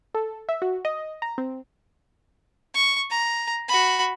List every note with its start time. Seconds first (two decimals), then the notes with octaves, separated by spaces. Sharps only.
0.14 A4
0.49 E5
0.62 F#4
0.85 D#5
1.22 A#5
1.38 C4
2.74 C#6
3.11 A#5
3.68 F#4 B5